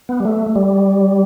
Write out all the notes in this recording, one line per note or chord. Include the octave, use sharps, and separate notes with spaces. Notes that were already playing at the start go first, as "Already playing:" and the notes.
B3
G3
A3
G3